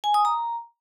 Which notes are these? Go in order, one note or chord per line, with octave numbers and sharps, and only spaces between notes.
G#5
D#6
A#5